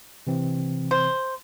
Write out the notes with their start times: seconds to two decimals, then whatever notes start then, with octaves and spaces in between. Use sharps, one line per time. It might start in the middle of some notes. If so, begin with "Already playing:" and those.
0.27 C3 E3 C4
0.91 C5